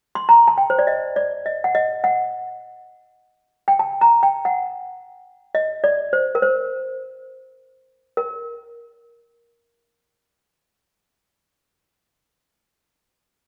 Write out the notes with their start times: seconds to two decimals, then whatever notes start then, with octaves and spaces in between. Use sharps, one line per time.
0.15 C6
0.29 A#5
0.48 A5
0.58 G5
0.70 C5
0.79 D5
0.87 D#5
1.16 D5
1.46 D#5
1.64 F#5
1.75 D#5
2.04 F#5
3.68 G5
3.79 A5
4.01 A#5
4.23 G5
4.45 F#5
5.55 D#5
5.84 D5
6.13 C5
6.35 A#4
6.42 C5
8.17 A#4